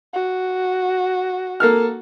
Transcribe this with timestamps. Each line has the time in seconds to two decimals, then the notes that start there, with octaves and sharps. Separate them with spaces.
0.14 F#4
1.60 A#3 A4 F6